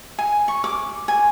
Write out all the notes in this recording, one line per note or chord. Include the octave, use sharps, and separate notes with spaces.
G#5
C#6
D6
G#5